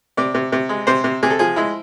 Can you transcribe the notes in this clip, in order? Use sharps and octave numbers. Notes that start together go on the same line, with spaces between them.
C3 D5
C3
C3
G#3
C3 C5
C3
C3 G#4
A4
F3 G#4
G#3 E4